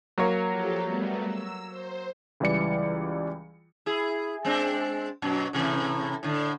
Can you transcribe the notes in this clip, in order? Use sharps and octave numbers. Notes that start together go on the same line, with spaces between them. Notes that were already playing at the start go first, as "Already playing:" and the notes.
F#3 A#3 C#5
F3 G4 A4
G3 A3 B3
E6
C5
C#2 E3 G3 D5 C#7
E4 G#4
G#3 C4 D4
F#2 B2 F#3
A2 C3 E3
A2 D3